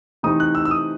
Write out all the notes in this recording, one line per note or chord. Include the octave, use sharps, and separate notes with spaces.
C3 E3 A3 C4 D#4 D#6
F#6
E6
E6
D#6